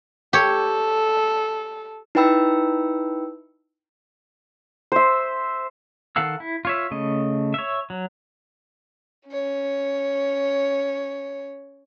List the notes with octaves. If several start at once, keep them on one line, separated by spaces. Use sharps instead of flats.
G4 A4 C#5
D#4 E4 B4 G5 B5 E6
C5 E5
D#3 A4 F5 F#5 E6
E4
F4 C#5 E5
C#3 A3 D#5
C#5 E5
F#3
C#4 C#5